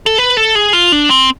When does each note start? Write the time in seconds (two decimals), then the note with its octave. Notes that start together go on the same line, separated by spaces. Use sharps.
0.06 A4
0.19 B4
0.37 A4
0.55 G#4
0.73 F4
0.92 D4
1.10 C4